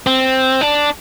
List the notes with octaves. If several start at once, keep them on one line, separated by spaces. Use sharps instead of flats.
C4
D4